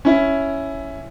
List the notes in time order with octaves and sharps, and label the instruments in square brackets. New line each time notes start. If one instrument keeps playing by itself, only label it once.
[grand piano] C#4 E4